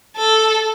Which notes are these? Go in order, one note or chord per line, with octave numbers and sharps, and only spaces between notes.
A4